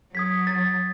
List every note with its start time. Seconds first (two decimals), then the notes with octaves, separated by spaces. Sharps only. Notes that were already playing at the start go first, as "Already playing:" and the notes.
0.15 F#3 D#6 G#6 B6
0.47 A6